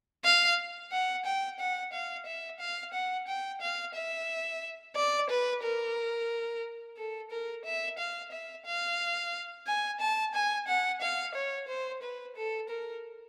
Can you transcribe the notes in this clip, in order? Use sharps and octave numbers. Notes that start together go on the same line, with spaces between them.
F5
F#5
G5
F#5
F5
E5
F5
F#5
G5
F5
E5
D5
B4
A#4
A4
A#4
E5
F5
E5
F5
G#5
A5
G#5
F#5
F5
C#5
C5
B4
A4
A#4